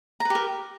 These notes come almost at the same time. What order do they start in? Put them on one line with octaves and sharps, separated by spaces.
A#5 B4 G4 A#4